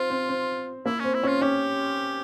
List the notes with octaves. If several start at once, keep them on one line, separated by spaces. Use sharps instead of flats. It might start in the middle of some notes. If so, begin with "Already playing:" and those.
Already playing: C4 F4
C4
C4
A#3 E4
C4 C#4
E4
C#4
F4
C#4 G4